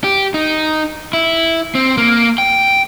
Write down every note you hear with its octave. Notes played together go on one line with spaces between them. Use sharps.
G4
D#4
E4
C4
A#3
G5